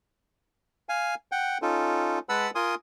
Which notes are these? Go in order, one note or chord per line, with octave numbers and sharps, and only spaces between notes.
F5 G#5
F#5 G5
C#4 D#4 F4 A4
G#3 B4 F#5 A5 B5 E6
F4 A#4 G#5 C6 D#6